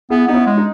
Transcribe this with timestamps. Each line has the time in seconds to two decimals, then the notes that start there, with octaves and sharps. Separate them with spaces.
0.10 B3 E4 G#4
0.28 B3 D#4
0.34 C#4 E4
0.47 G#3
0.58 D#4